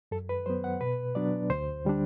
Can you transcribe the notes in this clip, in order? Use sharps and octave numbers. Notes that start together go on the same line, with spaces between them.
F#2 A4
B4
F#3 B3 C5
F#5
B2 B4
F#3 B3 D4 D5
D2 C5
D3 G3 D4